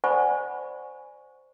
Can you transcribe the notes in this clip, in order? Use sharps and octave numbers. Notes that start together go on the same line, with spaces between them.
C5 D5 F#5 G#5 B5 C#6